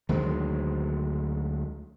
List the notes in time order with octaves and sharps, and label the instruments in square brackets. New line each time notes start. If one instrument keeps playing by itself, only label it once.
[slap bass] D2 D#3 F#3 G#3